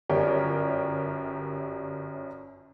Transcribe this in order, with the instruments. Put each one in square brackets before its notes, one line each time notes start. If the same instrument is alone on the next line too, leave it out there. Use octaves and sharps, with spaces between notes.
[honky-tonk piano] G1 F#2 G4 A#4 C#5 D5